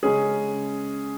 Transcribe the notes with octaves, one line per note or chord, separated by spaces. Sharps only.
C#3 G#3 C#4 G#4